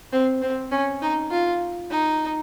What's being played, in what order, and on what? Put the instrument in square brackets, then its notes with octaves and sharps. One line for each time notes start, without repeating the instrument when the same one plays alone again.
[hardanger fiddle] C4
C4
C#4
D#4
F4
D#4